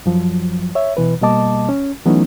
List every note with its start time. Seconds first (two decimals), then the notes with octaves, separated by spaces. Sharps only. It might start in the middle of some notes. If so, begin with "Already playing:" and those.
0.06 F#2 F3 F#3
0.75 C#5 E5
0.97 B2 E3 B4
1.22 B2 G3 A#3 D#5 A5 D6
1.69 C#4
2.05 E3 F#3 A3 B3 C#4 D#4